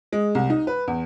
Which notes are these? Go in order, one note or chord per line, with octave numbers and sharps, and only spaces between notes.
G#3
C2
D#4
B4
E2